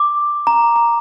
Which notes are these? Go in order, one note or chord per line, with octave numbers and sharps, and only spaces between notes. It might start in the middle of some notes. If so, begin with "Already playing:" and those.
Already playing: D6
A#5
A#5